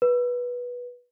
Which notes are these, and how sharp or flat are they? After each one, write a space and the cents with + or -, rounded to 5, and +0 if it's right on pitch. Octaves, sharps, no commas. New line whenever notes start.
B4 -15